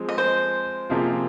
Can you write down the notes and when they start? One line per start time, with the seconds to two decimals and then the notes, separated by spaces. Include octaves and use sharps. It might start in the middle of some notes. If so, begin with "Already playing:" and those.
Already playing: F3 G#3 C4 G#4
0.09 D#5
0.18 C5
0.90 C3 F3 A#3 F4 G#4